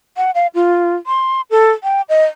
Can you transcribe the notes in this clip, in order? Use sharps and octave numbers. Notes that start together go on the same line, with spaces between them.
F#5
F5
F4
C6
A4
G5
D#5